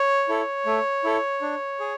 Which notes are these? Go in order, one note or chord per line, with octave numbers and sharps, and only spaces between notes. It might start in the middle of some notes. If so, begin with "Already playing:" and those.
Already playing: C#5
E4 A4
A3
E4 A4
D4
G#4